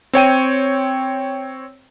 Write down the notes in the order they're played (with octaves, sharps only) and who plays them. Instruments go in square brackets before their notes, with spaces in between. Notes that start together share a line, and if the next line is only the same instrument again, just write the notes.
[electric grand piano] C4 C#5 G5 D#7